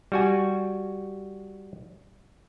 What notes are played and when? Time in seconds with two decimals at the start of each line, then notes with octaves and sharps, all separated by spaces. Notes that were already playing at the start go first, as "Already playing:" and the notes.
0.12 G3 F#4 G#5